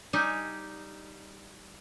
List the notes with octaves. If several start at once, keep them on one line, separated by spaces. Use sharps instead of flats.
G3 D#4 G4 G#5